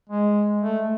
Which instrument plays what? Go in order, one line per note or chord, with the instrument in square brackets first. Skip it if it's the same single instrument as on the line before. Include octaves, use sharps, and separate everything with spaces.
[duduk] G#3
A3